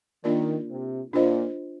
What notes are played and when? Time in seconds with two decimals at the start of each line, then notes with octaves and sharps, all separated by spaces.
0.24 D#3 A#3 D4 F4 A#4 D5
0.69 C3
1.13 A#2 D4 F4 C5 D#5